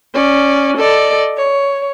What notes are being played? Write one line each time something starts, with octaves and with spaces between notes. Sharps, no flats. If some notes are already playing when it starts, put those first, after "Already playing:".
C#4 D5
A4 D5 D#5
C#5